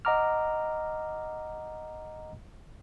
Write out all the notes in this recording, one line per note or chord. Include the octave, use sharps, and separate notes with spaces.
D#5 F#5 A#5 D6 F6